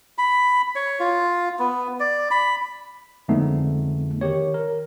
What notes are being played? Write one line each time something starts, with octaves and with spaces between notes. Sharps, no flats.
B5
C#5
F4
B3
D5
B5
F2 D3 G#3 A3 B3 D#4
D#3 G4 C#5
A#4